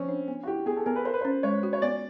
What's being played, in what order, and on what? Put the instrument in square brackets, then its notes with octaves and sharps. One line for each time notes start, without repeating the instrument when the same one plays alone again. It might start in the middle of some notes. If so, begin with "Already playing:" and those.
Already playing: [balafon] F3 [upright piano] C4 C#4
[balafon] D4
B3
[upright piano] F#4
[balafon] E4 [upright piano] G4
[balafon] B3 [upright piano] G#4
[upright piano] A4
[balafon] B3 [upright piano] A#4
[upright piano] B4
[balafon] A#4 [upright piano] C5
[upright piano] B4
[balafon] C#4 [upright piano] C5
[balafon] G#3 [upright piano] C#5
[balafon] F#4
[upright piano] C#5
[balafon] B3 [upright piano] D5